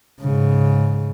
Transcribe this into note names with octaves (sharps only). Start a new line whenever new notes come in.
G#2 C#3